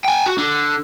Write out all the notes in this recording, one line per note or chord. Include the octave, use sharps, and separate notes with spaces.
G5 G#5
F#4
D3